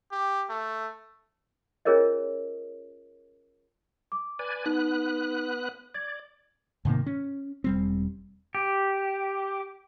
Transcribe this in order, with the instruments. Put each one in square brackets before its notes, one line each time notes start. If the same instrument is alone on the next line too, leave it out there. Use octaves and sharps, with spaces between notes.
[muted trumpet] G4
A3
[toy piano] C#4 F4 G#4 A#4 C#5 D#5
[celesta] D6
[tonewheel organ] B4 D5 G#5
[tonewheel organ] B3 B4 F#6 [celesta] D#4
[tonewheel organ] D5 [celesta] G#6
[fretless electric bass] G#2 C3 D#3 A#3
C#4
E1 G3 C4
[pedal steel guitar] G4